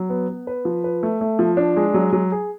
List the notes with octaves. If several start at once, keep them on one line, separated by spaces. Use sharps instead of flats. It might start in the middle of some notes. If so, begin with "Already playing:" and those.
Already playing: F#3
B3
B3
B4
F3
B4
A3
A3
F3
D4
G#3
F#3
F#3
G#4